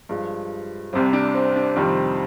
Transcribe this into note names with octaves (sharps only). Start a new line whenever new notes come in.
G2 F3 G#3
C2 C3 G3 C4
D4
C4
D4
F2 C3 D#3 G3 C4